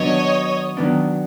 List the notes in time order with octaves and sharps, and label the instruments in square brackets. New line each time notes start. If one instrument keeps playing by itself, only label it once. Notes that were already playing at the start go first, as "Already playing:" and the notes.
Already playing: [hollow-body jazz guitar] D#3 F#3 B3 D4 [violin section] C#5 D#5
[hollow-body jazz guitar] D#3 F#3 B3 D4